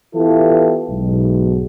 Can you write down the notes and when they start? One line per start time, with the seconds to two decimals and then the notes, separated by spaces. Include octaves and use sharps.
0.15 E3 B3 E4 F4 G4 A4
0.90 B1 G#2 B2